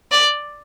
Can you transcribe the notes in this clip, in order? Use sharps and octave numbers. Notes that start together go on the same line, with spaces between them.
D5